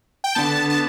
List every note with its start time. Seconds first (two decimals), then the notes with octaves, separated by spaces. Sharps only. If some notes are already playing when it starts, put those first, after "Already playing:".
0.24 G5
0.35 D3 B3 A5
0.70 A5